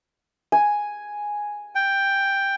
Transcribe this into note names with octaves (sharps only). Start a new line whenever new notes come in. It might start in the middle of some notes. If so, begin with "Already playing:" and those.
G#5
G5